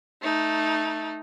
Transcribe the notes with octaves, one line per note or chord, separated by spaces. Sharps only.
A3 D#4